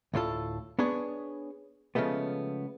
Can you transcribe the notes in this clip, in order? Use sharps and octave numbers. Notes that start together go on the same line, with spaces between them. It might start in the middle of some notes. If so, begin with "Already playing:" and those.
D2 A2 F4 A4
B3 D4 G#4 C#5
C#3 F3 G#3 A3 B3